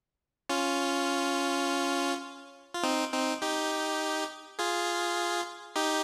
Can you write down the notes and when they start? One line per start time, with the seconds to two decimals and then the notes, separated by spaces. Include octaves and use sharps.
0.49 C#4 F4
2.74 F4
2.83 C4 D#4
3.13 C4 D#4
3.42 D#4 G4
4.59 F4 G#4
5.76 D#4 G4